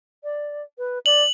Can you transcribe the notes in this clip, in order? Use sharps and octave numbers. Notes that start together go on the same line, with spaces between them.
D5
B4
D5 F#7